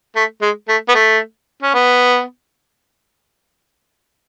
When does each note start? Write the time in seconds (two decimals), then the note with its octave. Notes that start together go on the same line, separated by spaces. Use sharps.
0.16 A3
0.42 G#3
0.68 A3
0.89 B3
0.95 A3
1.62 C#4
1.74 B3